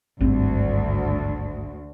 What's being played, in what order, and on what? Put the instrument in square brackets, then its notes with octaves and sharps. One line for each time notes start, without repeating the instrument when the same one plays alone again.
[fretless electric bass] G#1 G2 C4 [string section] D2